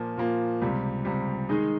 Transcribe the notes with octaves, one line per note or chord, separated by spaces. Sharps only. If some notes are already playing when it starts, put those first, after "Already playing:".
Already playing: A#2 F3 A#3
A#2 F3 A#3
C#2 C3 G3
C#2 C3 G3
D#3 G#3 D#4 G#4